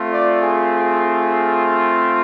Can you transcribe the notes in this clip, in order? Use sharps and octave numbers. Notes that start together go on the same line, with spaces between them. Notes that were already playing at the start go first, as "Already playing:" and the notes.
Already playing: A3 C4 F4
D5
G#4